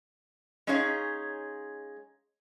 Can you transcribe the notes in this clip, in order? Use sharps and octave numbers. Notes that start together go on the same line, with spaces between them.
G#3 C#4 D#4 G#4 C#5 F5